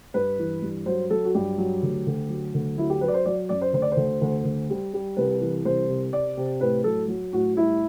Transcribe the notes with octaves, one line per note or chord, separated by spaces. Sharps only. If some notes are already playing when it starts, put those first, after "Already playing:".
G2 B4
E3
G2
F#3 C5
F#3 A4
F#4
G2 G4
F#3
D2
D2
F#3
D2
F#3 E4
G4
F#3 B4
D5
C5
F#3 D5
F#2 D5
C5
D2 C5
D5
C5
D2
D2
D2
G3
G3
C2 B4
E3
C2 C5
C3
C3 D5
C3
A2 B4
F#3 A4
F#3
A2 F#4
G3 E4